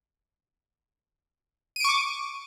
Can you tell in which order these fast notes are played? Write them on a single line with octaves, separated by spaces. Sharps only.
D#7 D7 C#6 D6